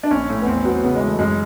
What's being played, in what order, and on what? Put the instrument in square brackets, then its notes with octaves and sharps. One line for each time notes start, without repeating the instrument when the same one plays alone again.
[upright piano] D4
[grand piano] A#1 [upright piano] C#4
[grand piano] A2
[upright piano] B3
[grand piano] E2 [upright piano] C4
[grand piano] F#3 [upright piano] B3
[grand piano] C#3 [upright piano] B3
[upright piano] G#3
[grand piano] E3
[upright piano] A3
[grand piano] F#2 [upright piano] G#3